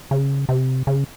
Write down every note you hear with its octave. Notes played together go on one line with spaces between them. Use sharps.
C#3
C3
C#3